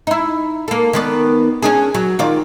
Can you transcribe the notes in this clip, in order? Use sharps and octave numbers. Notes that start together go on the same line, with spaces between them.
D#4 E4
A#3 A4
D#3 B3 D5
C#4 D4 G#4
F#3
D#3 F4 D5